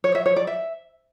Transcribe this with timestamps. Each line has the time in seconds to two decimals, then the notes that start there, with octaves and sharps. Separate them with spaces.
0.04 C#5
0.15 E5
0.26 C#5
0.36 D5
0.47 E5